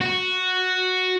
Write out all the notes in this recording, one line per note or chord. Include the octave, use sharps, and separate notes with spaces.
F#4